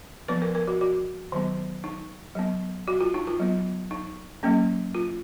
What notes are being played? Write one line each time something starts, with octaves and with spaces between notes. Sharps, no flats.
F3 B3 B4
A#4
A#4
F#4
F#4
D#3 F#3 B3
D#4
F#3 B3
F#4
F4
D#4
F4
F#3 B3
D#4
F#3 A#3 C#4
F4